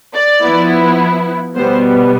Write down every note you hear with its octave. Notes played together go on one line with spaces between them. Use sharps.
D5
F3 B3 E4
B2 G3 B3 C5